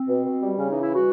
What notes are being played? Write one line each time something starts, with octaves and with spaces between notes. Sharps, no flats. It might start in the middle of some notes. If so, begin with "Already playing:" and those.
Already playing: C4
B2
B2
G3
C#3 C#4
E3 D#4
E4
G3 F#4